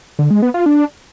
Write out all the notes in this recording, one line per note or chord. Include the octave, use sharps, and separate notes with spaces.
D3
G#3
B3
F4
D4